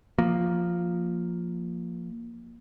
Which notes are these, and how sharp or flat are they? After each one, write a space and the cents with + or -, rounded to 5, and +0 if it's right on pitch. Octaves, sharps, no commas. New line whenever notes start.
F3 +0 A#3 +0